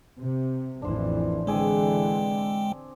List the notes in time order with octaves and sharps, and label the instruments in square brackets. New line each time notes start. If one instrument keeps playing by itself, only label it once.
[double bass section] C3
[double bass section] A1 F2 E3 [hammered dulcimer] D4 C5
[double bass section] D3 E3 [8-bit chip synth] G#3 G5 [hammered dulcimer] C4 G#4 D5